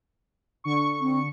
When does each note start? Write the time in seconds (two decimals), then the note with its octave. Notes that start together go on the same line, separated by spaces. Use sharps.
0.64 D3 C#6
1.01 C4